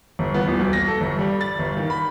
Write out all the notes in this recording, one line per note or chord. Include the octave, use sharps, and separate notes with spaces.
G1
B3
D#1
B1
A#6
A4
G1
G3
A6
G1
D#3
B5